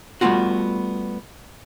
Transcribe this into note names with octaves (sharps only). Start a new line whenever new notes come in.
G3 A3 B3 C#4 F4 F#4